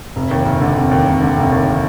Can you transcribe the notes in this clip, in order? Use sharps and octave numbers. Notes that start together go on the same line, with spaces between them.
F1
D#2
F1
D3
F1
D#2
F1
D3
F1
D#2